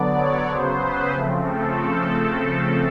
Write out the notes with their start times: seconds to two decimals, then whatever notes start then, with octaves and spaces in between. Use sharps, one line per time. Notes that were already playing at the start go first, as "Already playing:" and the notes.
Already playing: D3 F#3 B3 D5
0.19 C#5
0.50 C#3 F#3 B3 C5
0.81 B4
1.13 C#3 F3 A3 C4
1.44 A4